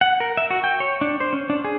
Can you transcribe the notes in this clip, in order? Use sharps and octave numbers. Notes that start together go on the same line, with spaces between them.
F#5
A#4
E5
F#4
G5
C#5
D4
C5
C#4
D4
G#4